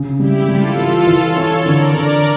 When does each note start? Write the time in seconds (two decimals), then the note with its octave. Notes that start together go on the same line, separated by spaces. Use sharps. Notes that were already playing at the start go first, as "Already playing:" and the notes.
Already playing: C#3
0.19 G3 E4 G4
0.49 G3 F4 A4
0.77 E3 F4 A4
1.07 E3
1.22 A4 C#5
1.37 E3
1.66 D3 A#4 D5
1.94 D3